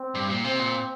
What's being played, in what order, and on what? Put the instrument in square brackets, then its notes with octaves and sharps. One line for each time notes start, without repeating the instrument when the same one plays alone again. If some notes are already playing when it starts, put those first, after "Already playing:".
Already playing: [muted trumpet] C4
[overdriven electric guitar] G2
A#2
[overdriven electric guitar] C3 [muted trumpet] C4
[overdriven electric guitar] A#2